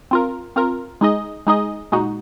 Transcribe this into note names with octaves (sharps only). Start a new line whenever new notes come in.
C4 F4 A#4
C4 F4 A#4
G#3 D#4 G#4 D#5
G#3 D#4 G#4 D#5
A#2 G#3 D#4 F#4